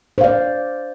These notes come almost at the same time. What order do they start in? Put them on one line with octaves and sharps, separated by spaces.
C5 F5 D5